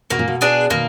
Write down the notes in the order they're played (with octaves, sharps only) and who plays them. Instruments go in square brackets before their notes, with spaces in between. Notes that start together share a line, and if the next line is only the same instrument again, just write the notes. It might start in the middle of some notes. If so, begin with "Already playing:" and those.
[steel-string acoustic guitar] B2 [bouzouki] A#3
[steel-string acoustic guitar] A#2
B2
[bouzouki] D4 G#4 B4
[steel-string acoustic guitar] B2 D#3 [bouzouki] A#3